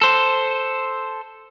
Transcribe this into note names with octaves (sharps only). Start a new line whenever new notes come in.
A4 C5